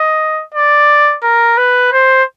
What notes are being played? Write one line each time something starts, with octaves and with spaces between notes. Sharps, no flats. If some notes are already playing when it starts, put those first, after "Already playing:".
Already playing: D#5
D5
A#4
B4
C5